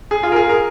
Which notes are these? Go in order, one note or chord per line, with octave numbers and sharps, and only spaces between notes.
G#4
F4
A#4
G#4
A#4